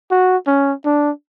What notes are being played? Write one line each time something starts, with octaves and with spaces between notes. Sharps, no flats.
F#4
C#4
D4